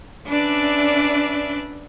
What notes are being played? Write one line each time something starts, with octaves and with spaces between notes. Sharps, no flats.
C#4 D4 B4 D5 E5